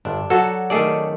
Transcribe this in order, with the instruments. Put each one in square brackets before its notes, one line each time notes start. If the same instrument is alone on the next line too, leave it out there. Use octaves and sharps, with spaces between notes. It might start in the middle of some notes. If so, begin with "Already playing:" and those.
[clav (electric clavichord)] G1 [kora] D4
[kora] F#3 [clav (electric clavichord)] F#4 A4
[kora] D#3 A3 C#4 [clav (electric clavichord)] G#4 A4 D5